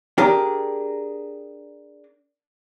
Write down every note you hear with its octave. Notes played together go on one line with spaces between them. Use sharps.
D4 G4 G#4 A#4